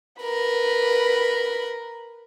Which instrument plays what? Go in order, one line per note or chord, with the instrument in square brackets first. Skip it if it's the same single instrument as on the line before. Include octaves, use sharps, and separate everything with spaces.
[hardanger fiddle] A#4 [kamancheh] B4 B5